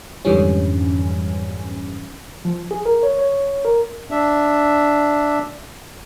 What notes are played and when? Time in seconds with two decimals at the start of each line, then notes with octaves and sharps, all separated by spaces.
0.25 F2 G#2 D3 E3 G3 C#4
2.45 F3
2.71 G#4
2.86 A#4
3.03 C#5
3.19 C#5
3.65 A#4
4.11 D4 E5